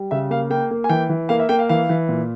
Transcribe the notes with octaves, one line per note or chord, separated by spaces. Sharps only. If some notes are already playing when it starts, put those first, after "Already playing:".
Already playing: G3
C#3 E5
A#3 F5
A#3 G5
A#3
G#5
E3 G5
E3
A#3 F5
E5
A#3 G5
F5
E3 F5
E3
A#2